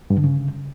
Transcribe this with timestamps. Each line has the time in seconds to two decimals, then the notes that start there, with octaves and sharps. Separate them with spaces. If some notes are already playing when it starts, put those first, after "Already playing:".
0.10 G2
0.17 D3
0.24 C#3